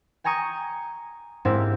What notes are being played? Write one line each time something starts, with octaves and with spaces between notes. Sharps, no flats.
G5 G#5 A#5 C#6 D#6 G#6
G#2 A#3 C4 D4 E4 G4